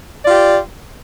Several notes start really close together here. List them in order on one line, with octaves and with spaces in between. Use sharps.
D5 F4 G4